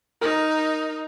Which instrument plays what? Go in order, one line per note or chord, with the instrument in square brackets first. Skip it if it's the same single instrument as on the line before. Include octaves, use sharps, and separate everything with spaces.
[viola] D#4 [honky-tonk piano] A#4